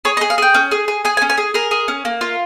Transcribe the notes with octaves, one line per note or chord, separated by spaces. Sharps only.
G#4 C#5
D#5
G#4
F5
G#4 G5
C#4
G#4
G#4
G#4 G#5
G#5
C#4
G#5
G#4
G#4 A#4
G#4
C#4
A#3
F4